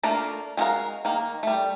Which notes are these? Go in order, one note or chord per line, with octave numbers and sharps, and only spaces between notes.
A3 A#3 D4 F4 A#4
G#3 C#4 F#4 A#4 F5
D#3 A#3
G3 A3